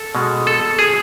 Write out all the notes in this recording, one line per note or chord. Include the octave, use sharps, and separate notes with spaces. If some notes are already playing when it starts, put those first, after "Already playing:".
Already playing: A4
B2 G#3
A4
G#4